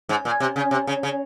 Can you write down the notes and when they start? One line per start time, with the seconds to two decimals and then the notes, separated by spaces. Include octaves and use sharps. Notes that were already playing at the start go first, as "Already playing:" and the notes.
0.09 G#2
0.25 A#2
0.40 C3
0.56 C#3
0.71 C3
0.87 C#3
1.03 C#3